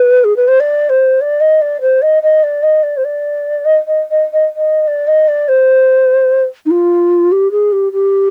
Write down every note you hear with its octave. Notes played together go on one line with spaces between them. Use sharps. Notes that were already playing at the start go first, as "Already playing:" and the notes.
Already playing: B4
G#4
B4
C5
D5
C5
D5
D#5
D5
C5
D#5
D#5
D5
D#5
D5
C5
D5
D#5
D#5
D#5
D#5
D#5
D5
D#5
D5
C5
D#4
F4
G4
G#4
G4
G4